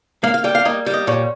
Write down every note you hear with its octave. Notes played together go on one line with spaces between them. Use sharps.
A#3 F5
F5
G3 G5
F5
A#3 D#5
G3
D#5
A#2 C#5